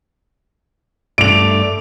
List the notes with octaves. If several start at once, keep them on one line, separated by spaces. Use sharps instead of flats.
G2 A3 D5 D7 F7